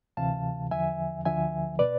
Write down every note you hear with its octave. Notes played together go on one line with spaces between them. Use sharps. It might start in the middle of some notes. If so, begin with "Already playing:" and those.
D2 C3 E3 F5 A5
E2 D3 F3 E5 G#5
D2 D3 F3 E5 G#5
B2 B4 D5